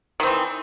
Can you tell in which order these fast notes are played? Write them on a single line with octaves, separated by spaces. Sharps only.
D#3 C4 E3